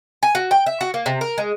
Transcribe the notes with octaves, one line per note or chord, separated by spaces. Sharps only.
G#5
F#4
G5
E5
F#4
A#3
C3
A#4
G#3